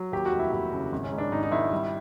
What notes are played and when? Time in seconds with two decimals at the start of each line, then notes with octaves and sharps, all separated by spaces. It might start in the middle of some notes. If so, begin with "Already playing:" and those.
Already playing: F#3
0.12 D#2 G4
0.26 F#4
0.32 F1
0.39 E4
0.53 D#2 E4
0.72 C#3
0.92 G#1
1.04 C#4
1.12 G#2
1.18 D4
1.31 G#1 D#4
1.43 D#4
1.51 G#1 E4
1.72 G3